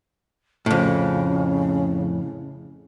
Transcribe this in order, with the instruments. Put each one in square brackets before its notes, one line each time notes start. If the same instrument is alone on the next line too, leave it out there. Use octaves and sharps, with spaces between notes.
[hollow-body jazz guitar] F2 A2 [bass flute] C#3